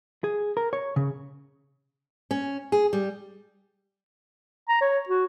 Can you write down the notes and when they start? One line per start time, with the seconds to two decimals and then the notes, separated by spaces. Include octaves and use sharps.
0.24 G#4
0.57 A#4
0.73 C#5
0.96 C#3
2.31 C#4
2.72 G#4
2.93 G3
4.69 A#5
4.81 C#5
5.09 F#4